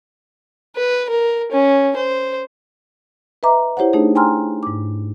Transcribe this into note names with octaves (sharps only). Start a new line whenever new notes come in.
B4
A#4
C#4
C5
B4 D#5 E5 A#5 D6
E4 G4 C5 C#5 F#5
A3 D4 D#4 G#4
G5 G#5 A#5 C6 E6 F6
G#2 D6